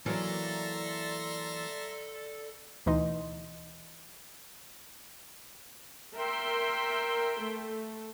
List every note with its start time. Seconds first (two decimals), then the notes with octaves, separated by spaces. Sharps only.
0.06 E3 F#3 A#3 A4 D5 E5 A#5 C6
2.86 D2 B2 E3 D#4 D#5 C6
6.16 A#4 E5 G5 C6
7.43 A3